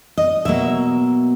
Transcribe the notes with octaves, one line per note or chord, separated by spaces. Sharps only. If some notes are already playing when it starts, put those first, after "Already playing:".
D#5
B2 F#3 A#3 E5